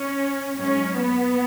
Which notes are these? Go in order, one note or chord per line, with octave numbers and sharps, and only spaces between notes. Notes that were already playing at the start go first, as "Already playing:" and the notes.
Already playing: C#4
G#2 F#3 C#4
B3